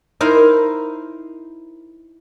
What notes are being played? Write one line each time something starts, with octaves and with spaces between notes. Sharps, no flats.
D#4 E4 A#4 C5